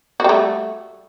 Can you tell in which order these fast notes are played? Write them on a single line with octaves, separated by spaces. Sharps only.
F#4 G3 A3